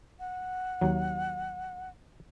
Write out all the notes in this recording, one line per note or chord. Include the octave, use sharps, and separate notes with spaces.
F#5
D#2 F#3